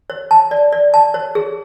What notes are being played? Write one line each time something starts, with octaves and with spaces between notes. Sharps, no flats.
C#5
A5
D5
D5
A5
C#5
G#4